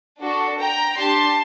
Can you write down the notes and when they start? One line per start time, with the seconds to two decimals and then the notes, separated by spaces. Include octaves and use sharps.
0.20 D4 F#4 A4
0.59 G5 A#5
0.97 D4 G4 A5 C6